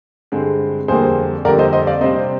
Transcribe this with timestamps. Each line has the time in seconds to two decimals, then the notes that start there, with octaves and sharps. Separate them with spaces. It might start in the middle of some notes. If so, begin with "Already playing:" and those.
0.32 G2 D3 G#3 C4
0.88 F2 D3 G3 A#3 G#4 C5
1.45 F2 D3 G3 A#3 A#4 D5
1.59 C5 D#5
1.73 C5 D#5
1.87 D5 F5
2.01 C3 G3 C4 C5 D#5